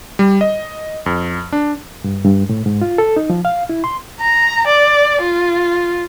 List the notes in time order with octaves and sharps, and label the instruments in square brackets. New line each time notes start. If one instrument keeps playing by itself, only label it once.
[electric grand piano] G3
D#5
F2
D4
[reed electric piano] G2
G2
A2
G#2
F4
A4
D#4
F3
F5
E4
C6
[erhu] A#5
D5
F4